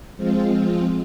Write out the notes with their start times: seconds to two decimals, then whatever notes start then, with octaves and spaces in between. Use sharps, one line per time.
0.16 F3 G#3 C4 F4